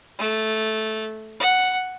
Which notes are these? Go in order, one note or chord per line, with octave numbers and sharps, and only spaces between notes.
A3
F#5